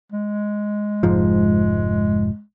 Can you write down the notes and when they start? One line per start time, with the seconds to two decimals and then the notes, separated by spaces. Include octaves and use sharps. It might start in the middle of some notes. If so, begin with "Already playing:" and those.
0.12 G#3
1.03 F1 G#2 F3